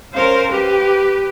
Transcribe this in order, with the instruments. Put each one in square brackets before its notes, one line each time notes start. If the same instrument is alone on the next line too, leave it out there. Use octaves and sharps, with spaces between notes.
[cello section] C#4 A#4 [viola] C5 F5
[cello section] G4 [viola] B4